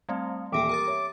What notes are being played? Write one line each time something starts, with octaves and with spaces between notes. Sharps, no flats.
G3 A3 C4 F5 A5
D#1 E3 G4 E5 G5 D6
A#4 A#5 D#6 A6
C#5 E5